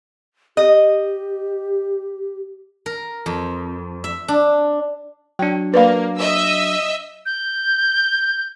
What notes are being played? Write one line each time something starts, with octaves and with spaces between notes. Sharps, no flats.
G4 D#5
A#4
F2
E5
D4
F#3 D4 G5
A#3 B4 D5 F5
D#5 E5 E6
G6